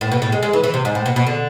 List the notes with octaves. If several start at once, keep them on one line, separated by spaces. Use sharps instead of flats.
A2
B2
A2
G#3
G#3
E3
E3
C3
G#2
A2
B2
B2
D3